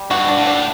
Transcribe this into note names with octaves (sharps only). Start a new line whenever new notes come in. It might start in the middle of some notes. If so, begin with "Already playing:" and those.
Already playing: G3
G2 F#4
D4
A2
D4